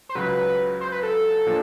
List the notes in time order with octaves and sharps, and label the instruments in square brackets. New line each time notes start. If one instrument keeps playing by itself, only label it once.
[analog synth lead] C5
[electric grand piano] C#2 C#3 F#3 [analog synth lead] B4
[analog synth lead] C5
B4
A4
[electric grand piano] A#2 F3 A#3 D4